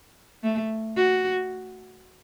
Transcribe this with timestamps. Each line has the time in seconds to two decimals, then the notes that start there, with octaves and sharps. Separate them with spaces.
0.43 A3
0.96 F#4